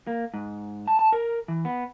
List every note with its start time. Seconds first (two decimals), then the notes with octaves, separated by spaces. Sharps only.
0.07 A#3
0.34 G#2
0.88 A5
0.99 A5
1.12 A#4
1.48 E3
1.65 B3